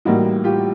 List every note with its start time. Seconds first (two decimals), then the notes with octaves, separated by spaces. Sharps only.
0.05 A2 E3 G3 A#3 D#4 F#4
0.44 F4 G4